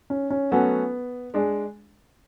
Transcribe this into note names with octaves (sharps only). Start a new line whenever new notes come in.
C#4
C#4
F#3 A3 B3 C#4 F#4 A4
G#3 D4 G#4